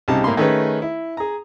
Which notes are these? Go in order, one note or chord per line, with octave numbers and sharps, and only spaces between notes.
C2 C#3 G3 D#4 A5
A2 A#3 B5 C6
D#3 A3 C#4 G#4 B4
E4
G#4 A#5